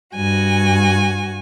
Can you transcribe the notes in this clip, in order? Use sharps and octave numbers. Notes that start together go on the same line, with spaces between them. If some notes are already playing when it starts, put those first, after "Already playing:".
G2 F#4 G#5